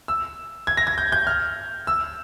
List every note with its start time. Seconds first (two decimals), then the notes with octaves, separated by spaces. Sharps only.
0.08 E6
0.67 G#6
0.77 A#6
0.87 G#6
0.98 G6
1.12 G6
1.27 F6
1.87 E6